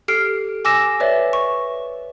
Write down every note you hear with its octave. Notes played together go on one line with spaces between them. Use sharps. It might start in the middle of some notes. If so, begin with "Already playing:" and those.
G4 A4 F6 C7 D7
G#5 D6 E6 A#6 E7
B4 C#5 D5 E5
C#6